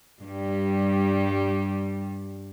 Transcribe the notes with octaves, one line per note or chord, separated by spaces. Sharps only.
G2 G3